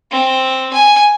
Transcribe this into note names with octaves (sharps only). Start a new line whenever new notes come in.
C4
G#5